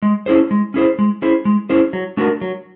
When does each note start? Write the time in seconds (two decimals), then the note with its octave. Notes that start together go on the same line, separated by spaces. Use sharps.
0.02 G#3
0.26 C#4 E4 G#4 C5
0.51 G#3
0.74 C#4 E4 G#4 C5
0.99 G#3
1.22 C#4 E4 G#4 C5
1.45 G#3
1.69 C#4 E4 G#4 C5
1.93 F#3
2.17 A3 D4 F#4 A#4
2.41 F#3